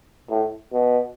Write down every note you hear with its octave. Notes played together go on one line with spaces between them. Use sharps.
A2
B2